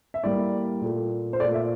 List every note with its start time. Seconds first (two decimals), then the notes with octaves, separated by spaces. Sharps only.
0.14 E5
0.24 A2 G3 A#3 D5
0.82 A#2 A3
1.33 C5
1.40 A3 D5
1.44 A#2
1.54 E5